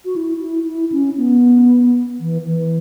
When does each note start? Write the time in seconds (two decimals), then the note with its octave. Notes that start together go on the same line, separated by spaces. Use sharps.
0.05 F#4
0.16 E4
0.42 E4
0.67 E4
0.92 C#4
1.18 B3
2.20 E3
2.46 E3